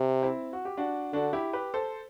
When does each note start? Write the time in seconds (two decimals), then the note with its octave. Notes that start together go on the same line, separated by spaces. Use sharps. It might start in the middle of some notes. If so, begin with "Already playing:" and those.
Already playing: C3
0.22 C4 E4
0.53 F#4
0.65 G4
0.77 D4 F#4
1.12 D3 D4 F#4
1.33 E4 G4
1.53 G4 B4
1.74 A4 C5